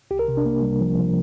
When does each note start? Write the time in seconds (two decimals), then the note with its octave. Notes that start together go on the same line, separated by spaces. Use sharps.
0.11 C2 G4
0.19 A#4
0.28 C3
0.37 D4
0.45 C2 A#3
0.62 C3 G3
0.80 C2 F3
0.97 C3 F3